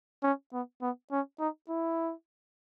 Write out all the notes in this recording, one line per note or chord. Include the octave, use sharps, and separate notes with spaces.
C#4
B3
B3
C#4
D#4
E4